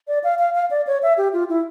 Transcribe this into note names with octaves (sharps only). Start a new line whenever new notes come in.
D5
F5
F5
F5
D5
C#5
E5
G4
F4
E4